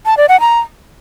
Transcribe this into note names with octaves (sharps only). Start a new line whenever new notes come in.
A5
D5
F#5
A#5